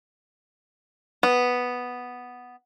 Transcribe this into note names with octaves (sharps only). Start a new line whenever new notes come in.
B3